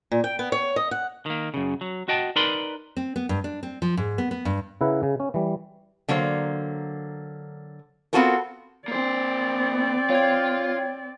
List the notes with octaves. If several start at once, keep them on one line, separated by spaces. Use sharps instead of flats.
A#2
G5
B3
C#5
D#5
F#5
D#3 A#3
F#2 C#3
F#3
F#4 D#5 G5 A5
D#4 A#4 B4 D5 B5 C6
C4
B3
G2
D4
C4
F3
G#2
B3
B3
G2
C#3 E4 B4 F#5 A#5
C#3
C#4
E3 G3
D3 F#3 A#3 C5
B3 C4 F4 F#4 A4 A#4
A#3 C4 C5 D5
F4 C#5 G5 G#6